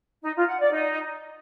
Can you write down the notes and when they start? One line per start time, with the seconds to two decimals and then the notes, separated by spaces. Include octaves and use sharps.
0.24 D#4
0.36 F4
0.47 F#5
0.59 D5
0.71 D#4